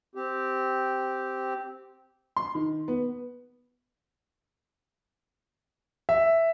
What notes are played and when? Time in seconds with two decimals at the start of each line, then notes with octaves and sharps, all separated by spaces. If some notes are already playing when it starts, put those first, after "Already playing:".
0.15 C4 G4
2.36 C6
2.55 D#3
2.88 B3
6.09 E5